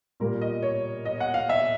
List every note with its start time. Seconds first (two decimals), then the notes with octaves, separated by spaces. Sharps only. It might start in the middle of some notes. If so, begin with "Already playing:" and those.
0.20 A#2 G3 A#3 A#4
0.41 D#5
0.63 C#5
1.05 D#5
1.20 F#5
1.34 F5
1.49 E5